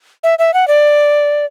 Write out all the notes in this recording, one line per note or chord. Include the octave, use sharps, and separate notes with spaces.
E5
E5
F#5
D5